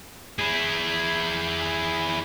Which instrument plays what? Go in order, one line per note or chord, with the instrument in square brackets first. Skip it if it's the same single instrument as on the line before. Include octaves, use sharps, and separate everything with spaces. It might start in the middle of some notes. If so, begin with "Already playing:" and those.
[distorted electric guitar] E4 G#4